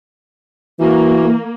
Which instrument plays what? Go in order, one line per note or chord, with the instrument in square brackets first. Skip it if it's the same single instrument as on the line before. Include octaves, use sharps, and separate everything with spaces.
[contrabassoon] E3 [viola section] A#3 [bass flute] F#4